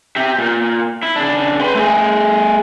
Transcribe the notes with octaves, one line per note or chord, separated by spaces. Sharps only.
G4 E5
A#2
E4
C#3 D4
B4 C6
A3 G#4